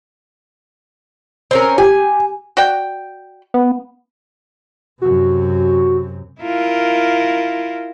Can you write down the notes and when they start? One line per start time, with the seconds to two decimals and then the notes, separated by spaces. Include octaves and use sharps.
1.51 C4 C#4 A#4
1.78 G4 G#5
2.57 F#4 D5 G5
3.54 B3
5.02 F#2 C3 F#4
6.42 E4 F4 A#4